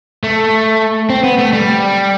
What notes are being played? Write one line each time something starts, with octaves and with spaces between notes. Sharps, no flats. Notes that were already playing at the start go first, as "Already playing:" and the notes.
A3
C4
B3
A3
G3